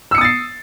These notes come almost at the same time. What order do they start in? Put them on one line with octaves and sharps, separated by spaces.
E6 C#7 D#6 A6 C7